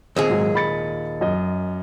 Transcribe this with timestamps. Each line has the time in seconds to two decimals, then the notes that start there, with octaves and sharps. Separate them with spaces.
0.16 D#2 A#2 C4 G#4
0.30 G#2 F#3
0.55 B5 A6 C#7
1.21 F#2 D#5